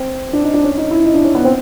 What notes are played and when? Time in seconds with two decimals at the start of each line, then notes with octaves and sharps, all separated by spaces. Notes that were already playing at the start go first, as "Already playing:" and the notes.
Already playing: C4
0.33 D4
0.44 D#4
0.54 D4
0.64 C#4
0.77 D#4
0.91 E4
1.04 D#4
1.14 D4
1.25 C#4
1.35 B3
1.45 C4